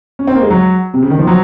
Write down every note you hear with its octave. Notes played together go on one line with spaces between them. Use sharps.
C#4
C4
A#3
G#3
F#3
C3
C#3
D#3
F3
F#3